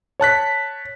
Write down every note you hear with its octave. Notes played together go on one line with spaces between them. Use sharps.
C#5 A5 F#6 B6